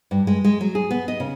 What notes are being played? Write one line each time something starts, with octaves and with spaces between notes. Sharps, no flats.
G2
G#3
G#3
F#3
G#4
B3
D#5
C#3